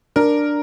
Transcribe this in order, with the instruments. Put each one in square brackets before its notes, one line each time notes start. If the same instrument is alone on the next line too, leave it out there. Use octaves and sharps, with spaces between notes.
[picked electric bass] D4 [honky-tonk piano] A#4